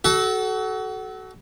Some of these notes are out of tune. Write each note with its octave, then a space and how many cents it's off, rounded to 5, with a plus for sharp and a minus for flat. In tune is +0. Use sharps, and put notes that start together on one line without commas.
F#4 +25 A4 -20